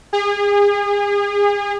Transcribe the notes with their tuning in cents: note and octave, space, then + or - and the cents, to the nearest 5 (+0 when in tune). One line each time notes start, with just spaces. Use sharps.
G#4 -35